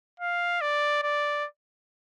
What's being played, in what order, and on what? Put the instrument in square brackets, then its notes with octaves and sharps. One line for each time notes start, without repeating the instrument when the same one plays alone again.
[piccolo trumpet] F5
D5
D5